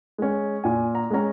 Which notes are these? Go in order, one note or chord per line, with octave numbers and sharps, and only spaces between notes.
G#3 C#4
A#2 G#5
A#5
G#3 C#4 A#5